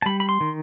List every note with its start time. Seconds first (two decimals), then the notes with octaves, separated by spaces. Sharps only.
0.02 A5
0.06 G3 B5
0.20 B5
0.29 C6
0.41 D#3